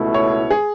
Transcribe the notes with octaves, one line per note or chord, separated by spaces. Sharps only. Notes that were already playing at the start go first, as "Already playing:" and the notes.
Already playing: C#2 B2 A3 E4
C#5
G#4